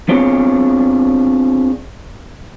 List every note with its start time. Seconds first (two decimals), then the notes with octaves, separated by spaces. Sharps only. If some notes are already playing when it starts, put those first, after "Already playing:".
0.09 B3 C4 D4 F4 G#4 C#5